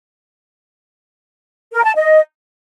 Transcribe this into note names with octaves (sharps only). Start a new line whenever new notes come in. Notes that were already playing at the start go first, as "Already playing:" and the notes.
A#4
A5
D#5